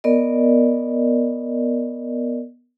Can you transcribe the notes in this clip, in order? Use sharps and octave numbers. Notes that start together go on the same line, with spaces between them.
B3 A#4 D5 D#5